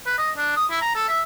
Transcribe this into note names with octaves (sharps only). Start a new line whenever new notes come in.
B4
D#5
D4
D#6
E4
A#5
A4
E5